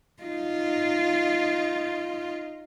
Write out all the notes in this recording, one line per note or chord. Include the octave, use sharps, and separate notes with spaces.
D#4 F4